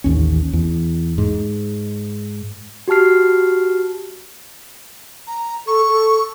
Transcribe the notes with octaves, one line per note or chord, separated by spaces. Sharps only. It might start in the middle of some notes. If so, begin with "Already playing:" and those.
A1 D#2 C#4
E2
G#2
F#4 G4 A5 F6 C7
A#5
A4 C#6
A4